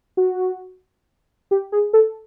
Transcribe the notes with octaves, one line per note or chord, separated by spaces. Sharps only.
F#4
G4
G#4
A4